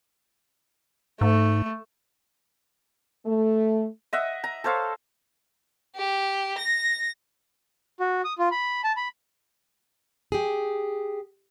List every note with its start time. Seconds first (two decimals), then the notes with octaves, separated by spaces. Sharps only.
1.21 G#2 A3
3.26 A3
4.13 D#5 E5 F#5
4.44 A#5
4.64 A4 C5 C#5 F5
5.96 G4
6.58 A#6
8.00 F#4
8.24 D#6
8.38 F4
8.51 B5
8.84 A5
8.97 B5
10.32 G4 G#4